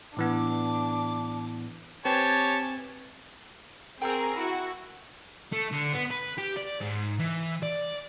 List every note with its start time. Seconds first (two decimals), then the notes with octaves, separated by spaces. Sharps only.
0.17 A2 E3 B3 D4 D6
2.05 C4 G4 B4 C#5 G#5 A5
4.02 C4 G#4 A#4 G5 C#6 E6
4.36 E4 F#4
5.53 A3
5.72 D3
5.93 B3
6.11 B4
6.38 G4
6.56 D5
6.81 G#2
7.19 E3
7.63 D5